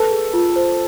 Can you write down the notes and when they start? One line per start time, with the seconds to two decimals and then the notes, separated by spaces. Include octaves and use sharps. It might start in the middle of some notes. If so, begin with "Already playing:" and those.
Already playing: A4 B4
0.11 G#4
0.33 F4
0.56 C5